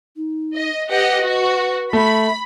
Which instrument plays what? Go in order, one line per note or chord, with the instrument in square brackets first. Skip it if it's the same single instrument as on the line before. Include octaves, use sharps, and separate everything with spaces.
[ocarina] D#4
[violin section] D#5
[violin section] G4 D#5 F#5 [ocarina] B4
[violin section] F#4
[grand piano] A3 [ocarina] E5 [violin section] B5